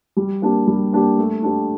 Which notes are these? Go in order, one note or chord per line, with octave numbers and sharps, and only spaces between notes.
G3
A#3 D4 G4
G3
A#3 D4 G4
A3
D4 G4